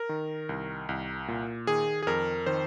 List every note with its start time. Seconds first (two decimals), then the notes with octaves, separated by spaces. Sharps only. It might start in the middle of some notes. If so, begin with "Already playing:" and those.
Already playing: A#4
0.09 D#3
0.49 C2
0.89 C2
1.28 A#2
1.67 D#3 G#4
2.03 G#4
2.07 F2 A#4
2.46 D#3 C5